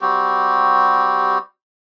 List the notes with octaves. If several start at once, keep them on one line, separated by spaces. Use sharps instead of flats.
G3 C4 F#4 G4